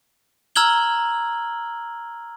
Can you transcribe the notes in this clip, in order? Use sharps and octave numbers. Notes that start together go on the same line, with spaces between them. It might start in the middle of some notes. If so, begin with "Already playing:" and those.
A#5 E6 F6 G#6 F#7 G7